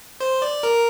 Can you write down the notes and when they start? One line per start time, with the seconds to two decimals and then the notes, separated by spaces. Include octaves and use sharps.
0.21 C5
0.42 D5
0.63 A#4